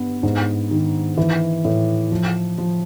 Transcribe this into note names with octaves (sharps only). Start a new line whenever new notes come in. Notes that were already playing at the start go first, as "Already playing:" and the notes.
Already playing: G2 B3
G#2
D#3
E3
A2
F3
F3